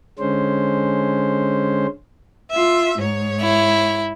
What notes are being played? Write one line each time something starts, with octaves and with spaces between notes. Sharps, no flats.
D3 G#3 C#4 C5
F4 E5
G#2 C#5
E4